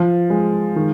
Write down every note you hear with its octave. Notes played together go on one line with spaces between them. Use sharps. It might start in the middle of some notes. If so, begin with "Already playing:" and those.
Already playing: F3
G#3
D#3